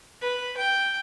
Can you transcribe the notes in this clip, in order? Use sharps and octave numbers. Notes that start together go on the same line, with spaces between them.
B4
G5